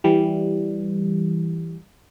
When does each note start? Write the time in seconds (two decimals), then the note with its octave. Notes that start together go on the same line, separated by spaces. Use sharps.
0.04 E3 G3